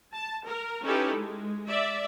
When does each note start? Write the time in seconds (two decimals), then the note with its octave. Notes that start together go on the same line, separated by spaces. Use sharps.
0.14 A5
0.47 A#4
0.84 C#4 D#4 E4 G4 A4 B4
1.15 G#3
1.69 D5 E5